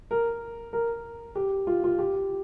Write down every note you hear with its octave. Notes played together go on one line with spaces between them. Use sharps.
A#4
A#4
G4
F4
F4
G4